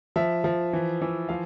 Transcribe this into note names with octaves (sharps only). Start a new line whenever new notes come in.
F3 E5
F3
E3
E3
F3 F5